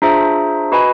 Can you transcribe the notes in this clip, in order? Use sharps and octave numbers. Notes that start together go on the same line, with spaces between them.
D4 F4 G#4 C5 E5 A#5
F#4 B4 D#5 G#5 B5